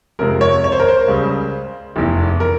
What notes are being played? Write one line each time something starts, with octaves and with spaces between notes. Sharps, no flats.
F2 C3 F3 G#3 A#4
C#5
C#5
C5
A#4
C5
C#2 C#3 G3
F1 E2 E3
A#4